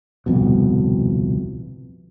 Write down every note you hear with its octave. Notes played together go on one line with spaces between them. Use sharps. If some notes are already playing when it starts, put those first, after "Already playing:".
D1 C2 F2 B2